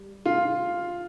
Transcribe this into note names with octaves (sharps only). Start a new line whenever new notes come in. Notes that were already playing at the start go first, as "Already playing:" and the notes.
Already playing: G3
F4